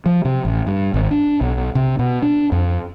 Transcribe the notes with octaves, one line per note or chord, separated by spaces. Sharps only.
F3
C3
A1
G2
G#1
D4
B1
C3
B2
D4
F2